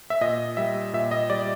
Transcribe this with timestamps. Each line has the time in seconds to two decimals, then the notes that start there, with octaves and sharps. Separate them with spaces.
0.10 E5
0.21 A#2 D#5
0.57 G3 E5
0.93 A#2 E5
1.11 D#5
1.30 G3 D5